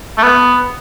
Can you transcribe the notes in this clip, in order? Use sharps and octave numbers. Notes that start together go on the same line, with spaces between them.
A3
B3